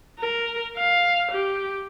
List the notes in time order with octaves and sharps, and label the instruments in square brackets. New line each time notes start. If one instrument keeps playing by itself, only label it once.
[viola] A#4
F5
G4